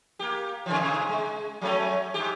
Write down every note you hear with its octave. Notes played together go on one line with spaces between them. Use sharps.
A#3 G4
C3 D#3 F3
G#2 C3
G#3
F#3 A3 C#4
G#2 F#4 G4